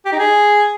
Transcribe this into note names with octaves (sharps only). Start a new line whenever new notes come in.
G4
D#4
G#4